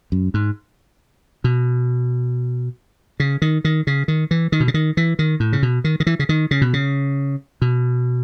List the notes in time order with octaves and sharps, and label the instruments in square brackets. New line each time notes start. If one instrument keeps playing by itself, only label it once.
[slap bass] F#2
G#2
B2
C#3
D#3
D#3
C#3
D#3
E3
D#3
B2
C#3
D#3
E3
D#3
A2
C#3
B2
D#3
D#3
E3
C#3
D#3
C#3
B2
C#3
B2